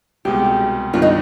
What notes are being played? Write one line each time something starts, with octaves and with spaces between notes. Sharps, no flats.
C2 B2 G#3 G4
G2 D#3 G3 B3 D4 F4
D#4